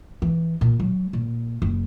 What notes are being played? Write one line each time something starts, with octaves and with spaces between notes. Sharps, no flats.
E3
A#2
F#3
A#2
F#1